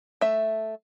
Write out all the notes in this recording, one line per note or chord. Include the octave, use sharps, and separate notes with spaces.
A3 E5